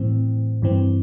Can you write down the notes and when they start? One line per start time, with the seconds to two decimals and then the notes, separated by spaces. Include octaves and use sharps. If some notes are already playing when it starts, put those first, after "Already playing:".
Already playing: A2 E3 C4
0.62 G2 E3 C4